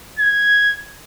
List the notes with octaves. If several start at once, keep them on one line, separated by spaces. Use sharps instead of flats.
G#6